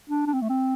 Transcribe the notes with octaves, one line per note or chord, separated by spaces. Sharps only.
D4
D4
C4
A3
C4